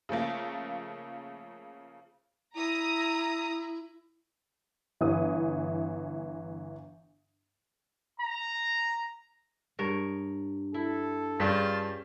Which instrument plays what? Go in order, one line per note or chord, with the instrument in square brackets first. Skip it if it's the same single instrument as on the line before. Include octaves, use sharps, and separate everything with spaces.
[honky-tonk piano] C#3 F3 A3 A#3
[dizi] E4 [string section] A#5 D#6
[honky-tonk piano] G1 E3 D#6
[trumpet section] A#5
[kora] G2 A#4 C#5
[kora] E4 [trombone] A4
[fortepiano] G2 [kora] C#4 G4 G#4 [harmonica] F4 A5